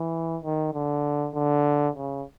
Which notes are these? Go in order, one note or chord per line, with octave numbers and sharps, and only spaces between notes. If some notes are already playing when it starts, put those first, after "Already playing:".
Already playing: E3
D#3
D3
D3
C#3